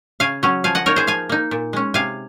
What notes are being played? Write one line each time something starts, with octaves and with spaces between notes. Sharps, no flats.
C#3 F5 G#5
F#3 C#4
F3 F5 G#5
D#5 F#5
A#3 D#4 A#4 C#5
G#4 C5
F3 F5 G#5
A#3 D#4
A#2
G#3 C#4
C3 F5 G#5